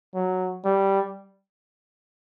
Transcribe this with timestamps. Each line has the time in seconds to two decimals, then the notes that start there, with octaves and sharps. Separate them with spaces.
0.15 F#3
0.65 G3